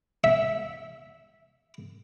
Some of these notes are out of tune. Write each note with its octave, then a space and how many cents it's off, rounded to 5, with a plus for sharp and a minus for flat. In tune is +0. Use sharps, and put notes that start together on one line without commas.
E5 -10